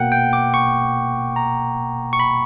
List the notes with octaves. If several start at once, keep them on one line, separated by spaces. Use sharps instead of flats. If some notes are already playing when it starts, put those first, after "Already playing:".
Already playing: B2 A#3 F#5 G5
G5
D6
C#6
A#5
C#6
B5